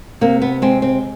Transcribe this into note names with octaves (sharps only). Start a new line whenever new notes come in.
C3 A#3
B3
G#3 C4
C4